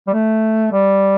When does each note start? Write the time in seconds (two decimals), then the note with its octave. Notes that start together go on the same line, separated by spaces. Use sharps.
0.08 G3
0.13 A3
0.72 G3